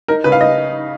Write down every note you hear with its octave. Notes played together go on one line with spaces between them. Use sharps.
D#4 A#4
C#3 B4
F5
D#4 D#5